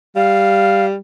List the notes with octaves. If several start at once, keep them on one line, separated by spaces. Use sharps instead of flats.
G3 F5